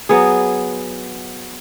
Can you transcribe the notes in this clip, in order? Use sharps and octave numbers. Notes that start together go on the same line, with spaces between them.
F#3 B3 G#4